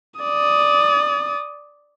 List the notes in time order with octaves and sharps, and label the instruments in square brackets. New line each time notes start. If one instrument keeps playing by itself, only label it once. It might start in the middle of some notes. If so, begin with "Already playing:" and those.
[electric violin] D5 D#6